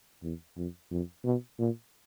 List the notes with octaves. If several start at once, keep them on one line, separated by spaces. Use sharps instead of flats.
E2
F2
F2
B2
A#2